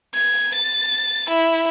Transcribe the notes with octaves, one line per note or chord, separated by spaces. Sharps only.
G#6
A6
E4